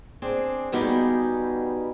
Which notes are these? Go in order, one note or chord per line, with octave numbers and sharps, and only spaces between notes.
C4 D4 G#4
B2 G3 B3 D#4 G4 G#4